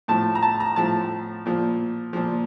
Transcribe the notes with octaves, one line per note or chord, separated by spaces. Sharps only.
A2 F3 A5
A#5
A5
A#5
A2 F3 A5
A#2 F3
A#2 F3